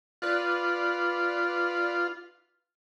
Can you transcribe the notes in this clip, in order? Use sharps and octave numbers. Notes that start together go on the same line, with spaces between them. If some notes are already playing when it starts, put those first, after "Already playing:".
F4 B4 D5 F#6